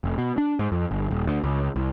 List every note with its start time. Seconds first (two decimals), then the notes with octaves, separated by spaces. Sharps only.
0.04 F1
0.18 B2
0.38 D4
0.59 G#2
0.72 F2
0.91 G1
1.11 D#1
1.27 D2
1.43 C#2
1.76 C2